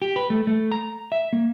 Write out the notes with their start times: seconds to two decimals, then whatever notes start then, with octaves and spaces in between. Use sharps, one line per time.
0.02 G4
0.16 B4
0.30 A3
0.47 A3
0.72 A#5
1.12 E5
1.33 A#3